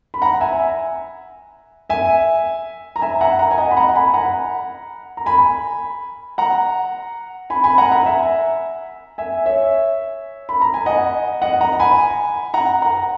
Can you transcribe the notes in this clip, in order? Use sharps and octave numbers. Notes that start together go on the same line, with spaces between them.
B5
F#5 A#5
E5 G#5
E5 G#5
A#5
E5 G#5
F#5 A#5
F#5 A#5
G#5
D#5 F#5
B5
F#5 A#5
G#5 B5
F#5 A#5
A#5
G#5 B5
F#5 A#5
G#5 B5
G#5 B5
F#5 A#5
F#5 A#5
E5 G#5
E5 G#5
C#5 E5
B5
A#5
G#5
D#5 F#5
D#5 F#5
F#5 A#5
G#5 B5
F#5 A#5
F#5 A#5